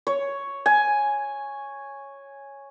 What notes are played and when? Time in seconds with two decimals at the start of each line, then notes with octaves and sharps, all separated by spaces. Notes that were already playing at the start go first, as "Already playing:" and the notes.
0.07 C#5
0.66 G#5